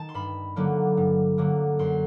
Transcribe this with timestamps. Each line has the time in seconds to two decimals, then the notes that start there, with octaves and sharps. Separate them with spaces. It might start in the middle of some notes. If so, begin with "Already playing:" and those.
Already playing: D#3 A5
0.09 C6
0.14 G2 B5
0.56 D3 F#3 A#3
0.97 G2
1.38 D3 F#3 A#3
1.79 F#2 C6